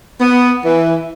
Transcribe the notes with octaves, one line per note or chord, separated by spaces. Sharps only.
B3
E3